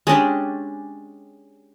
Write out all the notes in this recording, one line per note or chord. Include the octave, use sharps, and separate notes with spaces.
G#3 C#4 D4 G4